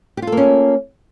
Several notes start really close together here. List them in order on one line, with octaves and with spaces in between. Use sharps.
G4 F4 A4 A#3 C#4